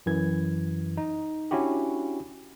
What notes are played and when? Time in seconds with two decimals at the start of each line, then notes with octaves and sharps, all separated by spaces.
0.06 F#2 E3 G#6
0.97 D#4
1.51 C#4 D4 E4 F#4 G4